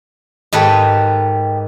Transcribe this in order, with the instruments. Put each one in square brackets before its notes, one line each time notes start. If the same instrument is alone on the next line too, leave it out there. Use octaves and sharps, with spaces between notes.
[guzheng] G#2 D#3 B4 [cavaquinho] G4 A4 D#5